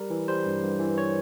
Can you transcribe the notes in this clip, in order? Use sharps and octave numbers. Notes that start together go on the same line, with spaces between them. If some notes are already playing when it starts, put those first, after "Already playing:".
Already playing: G3 A#4
E3
G3 C5
G2
G2
E3
C#5